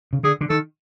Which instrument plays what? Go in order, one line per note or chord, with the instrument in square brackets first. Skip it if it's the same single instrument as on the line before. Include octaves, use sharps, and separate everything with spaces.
[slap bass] C#3
[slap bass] D3 [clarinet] G#4
[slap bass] D3
[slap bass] D#3 [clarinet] A4